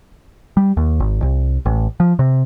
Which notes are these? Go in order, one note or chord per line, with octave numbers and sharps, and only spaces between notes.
G3
D#2
G#1
C2
A1
F3
C3